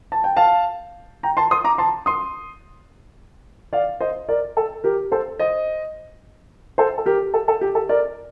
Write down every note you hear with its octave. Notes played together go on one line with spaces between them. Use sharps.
A5
G5
F5 A5
G5 A#5
A5 C6
C6 D#6
A#5 D6
A5 C6
C6 D#6
D5 F5
C5 D#5
A#4 D5
A4
G4 A#4
A4 C5
C5 D#5
A4 C5
A4
G4 A#4
A4
A4
G4
A4
A#4 D5